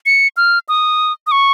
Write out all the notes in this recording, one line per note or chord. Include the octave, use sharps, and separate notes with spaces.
C#7
F6
D#6
D#6
C#6